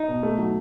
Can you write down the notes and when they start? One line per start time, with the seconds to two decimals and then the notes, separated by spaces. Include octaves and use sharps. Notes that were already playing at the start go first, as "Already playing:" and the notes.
Already playing: D#4
0.08 B2
0.23 A3
0.38 F#3